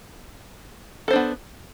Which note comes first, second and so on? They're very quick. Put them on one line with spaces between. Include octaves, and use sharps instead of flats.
A4 C5 D4 B3